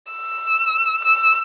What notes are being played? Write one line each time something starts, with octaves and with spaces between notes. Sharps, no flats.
E6
E6